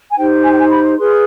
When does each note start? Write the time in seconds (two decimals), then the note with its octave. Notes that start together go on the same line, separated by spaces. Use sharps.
0.11 G#5
0.17 D#4 G4 C5 G5
0.43 G#5
0.51 G5
0.59 G#5
0.70 B5
0.97 F4 G#4 B4 C6